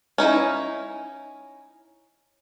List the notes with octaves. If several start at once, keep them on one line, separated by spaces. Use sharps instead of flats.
C#4 D#4 E4